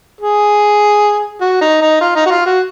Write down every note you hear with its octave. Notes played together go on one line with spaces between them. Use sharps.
G#4
F#4
D#4
D#4
F4
D#4
F#4
F4
F#4